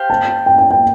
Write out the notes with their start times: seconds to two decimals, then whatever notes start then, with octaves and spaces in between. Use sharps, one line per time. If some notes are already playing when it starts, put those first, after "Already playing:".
Already playing: G4 C5 F5
0.10 A5
0.46 G5
0.58 G5
0.71 G5